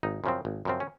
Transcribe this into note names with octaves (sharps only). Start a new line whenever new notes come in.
G#1 D#4
F#2 C#3 F3 C4
G#1
F#2 C#3 F3 C4
C#4